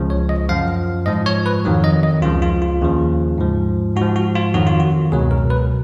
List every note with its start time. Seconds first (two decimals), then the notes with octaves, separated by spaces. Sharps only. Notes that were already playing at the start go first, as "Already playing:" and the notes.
Already playing: C#2 C#3 F3
0.10 C#5
0.29 D#5
0.49 F#2 F3 F5
1.06 G#2 F3 D#5
1.26 C#5
1.46 B4
1.65 F2 D#3 F#3
1.84 D#5
2.03 D#5
2.22 C#2 C#3 F3 F4
2.42 F4
2.62 F4
2.81 D#2 C#3 F3
3.38 G#2 F3
3.96 G#2 F#4
4.01 F3
4.16 F#4
4.35 F4
4.54 F2 D#3 F#3 F#4
4.67 F4
4.80 F#4
5.12 C#2 B2 F#3 G#4
5.31 A#4
5.50 B4